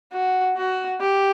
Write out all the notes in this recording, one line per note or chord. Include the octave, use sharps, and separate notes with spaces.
F#4
F#4
G4